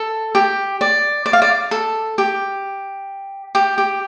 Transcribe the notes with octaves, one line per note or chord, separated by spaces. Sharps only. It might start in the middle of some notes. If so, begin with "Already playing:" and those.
Already playing: A4
G4
D5
D5
F5
D5
A4
G4
G4
G4